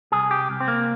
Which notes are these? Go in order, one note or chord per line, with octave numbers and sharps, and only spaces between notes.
C2 G#4
G4
C2
C4
A#3